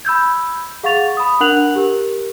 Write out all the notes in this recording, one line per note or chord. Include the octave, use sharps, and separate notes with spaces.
B5 E6 G6 G#6
G#4 F5 F#5 C#6 A6 F7
B5 D#6
D4 A#4 F#5 F#6 F7 F#7
G4 A#4